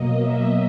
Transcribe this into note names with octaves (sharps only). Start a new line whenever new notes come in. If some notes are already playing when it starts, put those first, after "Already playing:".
Already playing: B2 F#3 A#3 D#5
E5